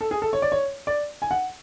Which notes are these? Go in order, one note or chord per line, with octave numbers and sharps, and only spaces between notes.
A4
G#4
A4
C#5
D5
C#5
D5
G#5
F#5